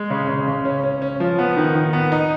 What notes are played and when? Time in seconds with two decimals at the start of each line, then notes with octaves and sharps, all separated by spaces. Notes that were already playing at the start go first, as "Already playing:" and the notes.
Already playing: G#3
0.10 C#3
0.28 C#3
0.47 C#3
0.65 C#4
0.84 C#4
1.02 C#4
1.20 F3
1.39 B3
1.57 D#3
1.75 D#3
1.93 B3
2.12 D#4